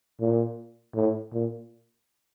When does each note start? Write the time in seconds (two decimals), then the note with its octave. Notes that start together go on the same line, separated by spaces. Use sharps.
0.20 A#2
0.95 A2
1.33 A#2